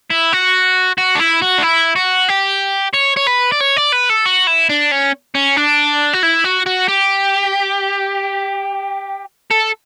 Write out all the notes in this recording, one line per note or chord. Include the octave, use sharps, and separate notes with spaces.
E4
F#4
F#4
D4
E4
F#4
D4
E4
F#4
G4
C#5
C#5
B4
D5
C#5
D5
B4
A4
F#4
E4
D4
C#4
C#4
D4
F#4
E4
F#4
F#4
G4
A4